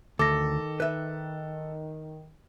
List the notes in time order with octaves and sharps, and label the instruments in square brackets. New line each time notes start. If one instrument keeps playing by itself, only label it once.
[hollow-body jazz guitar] D2 [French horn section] D#3 [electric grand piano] A4 [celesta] D6 A#6
[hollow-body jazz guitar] B4 E5